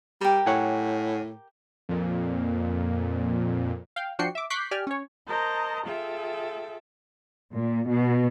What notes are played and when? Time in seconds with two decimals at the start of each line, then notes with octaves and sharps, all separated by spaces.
0.21 G3 G4 A#4
0.46 A2 C#5 F#5 G#5
1.89 F2 A#2
3.96 F5 G5
4.19 F3 D4 F#4 G5 C7 C#7
4.35 E5 D6
4.50 C#6 D6 F#6 G6 B6 C7
4.71 G4 D5 G#5 F6
4.87 C#4 C#5
5.26 A#4 C5 D#5 A5 A#5
5.87 F4 G#4 A4 E5 G5
7.54 A#2
7.88 B2